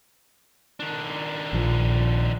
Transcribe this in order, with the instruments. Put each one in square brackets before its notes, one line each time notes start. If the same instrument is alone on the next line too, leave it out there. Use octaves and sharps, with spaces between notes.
[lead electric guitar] D#3 D4
[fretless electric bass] A#1 F3